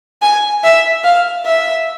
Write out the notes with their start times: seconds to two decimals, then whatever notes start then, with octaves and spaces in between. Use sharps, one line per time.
0.22 G#5
0.64 E5
1.04 F5
1.45 E5